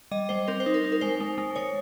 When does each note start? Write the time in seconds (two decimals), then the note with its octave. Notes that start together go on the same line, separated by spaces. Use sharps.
0.11 G3 D#5
0.29 G3 C5
0.48 C4 A#4
0.60 C5
0.66 D#4
0.74 A#4
0.84 D#4
0.92 A#4
1.01 G#3 C5
1.21 G#3
1.38 G#3
1.56 G#3 C#5